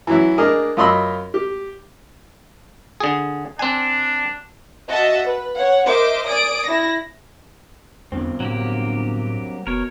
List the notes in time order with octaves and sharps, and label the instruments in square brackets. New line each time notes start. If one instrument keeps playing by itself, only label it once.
[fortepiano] E3 F#3 E4
A#3 D4 G#4 A#4 D#5
F#2 F4 D#5 B5 C6 E6
G4
[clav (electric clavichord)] D3 G#4
[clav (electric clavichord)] C4 G#5 [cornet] D4
[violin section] F#4 D#5 E5 A5
B4
C#5 F#5
A#4 C5 D#5 E5 D6
D5 G#5 D#6 D7
E4 A#6
[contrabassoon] G1 [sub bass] E2 [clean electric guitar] G2 C4
[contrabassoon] G1 [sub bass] A2 [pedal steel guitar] F#3 A#3 G4
[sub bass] F1 [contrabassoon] B2 [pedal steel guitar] A#4 C#5